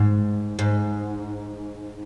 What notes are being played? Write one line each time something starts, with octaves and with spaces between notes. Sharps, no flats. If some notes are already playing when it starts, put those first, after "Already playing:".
Already playing: G#2
G#2